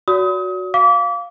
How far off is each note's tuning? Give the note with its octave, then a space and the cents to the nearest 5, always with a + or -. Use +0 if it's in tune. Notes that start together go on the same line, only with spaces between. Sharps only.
F#4 -5 D5 -45 D#6 +30
F5 +0 D6 -30